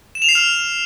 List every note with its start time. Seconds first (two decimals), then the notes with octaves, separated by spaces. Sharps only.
0.15 E7
0.22 F7
0.29 C7
0.35 F6